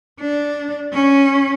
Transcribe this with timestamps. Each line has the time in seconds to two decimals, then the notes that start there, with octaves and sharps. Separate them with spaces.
0.20 D4
0.93 C#4